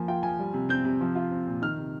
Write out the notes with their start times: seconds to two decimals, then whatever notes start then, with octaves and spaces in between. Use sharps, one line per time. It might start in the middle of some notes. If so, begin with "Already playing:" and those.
Already playing: F3 A#3 G#5
0.08 F4 G5
0.23 F3 G#5
0.39 G3
0.54 C3
0.69 C4 G6
0.85 C3
1.01 F3
1.15 F4
1.31 C4
1.47 A#2
1.62 D#3 F6
1.78 C3